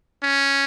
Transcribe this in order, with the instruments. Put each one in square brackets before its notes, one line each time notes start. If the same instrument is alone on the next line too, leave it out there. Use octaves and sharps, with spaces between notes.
[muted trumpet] C#4